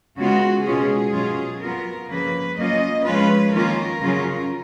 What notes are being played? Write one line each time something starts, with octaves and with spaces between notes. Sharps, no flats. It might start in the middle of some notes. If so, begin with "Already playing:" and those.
C#3 G#3 B3 F4 F#4
B2 G#3 C#4 F4 G#4
B2 F#3 C#4 F4
F#3 B3 F4 A#4
C#3 F3 A#3 B4
F#3 A#3 C#4 F4 D#5
F3 G#3 C#4 F4 B4
D#3 A#3 C#4 F4 A#4
C#3 F#3 C#4 F4